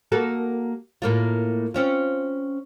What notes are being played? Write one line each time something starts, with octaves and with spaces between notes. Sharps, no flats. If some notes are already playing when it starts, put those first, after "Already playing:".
A#3 F#4 A4
A2 A#3 F4
C4 C#4 F4